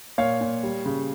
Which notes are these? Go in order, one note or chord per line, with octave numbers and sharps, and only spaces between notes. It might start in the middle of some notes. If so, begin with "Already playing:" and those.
A#2 C#5 F5
A#2
G3
C#3